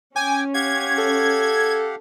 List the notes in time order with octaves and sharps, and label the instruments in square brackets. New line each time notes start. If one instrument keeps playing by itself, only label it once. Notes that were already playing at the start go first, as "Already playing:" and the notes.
[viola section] C#4 [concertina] G5 D6 [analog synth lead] G#5
[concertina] G4 F5 F#5 [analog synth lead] G#6
[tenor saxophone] A4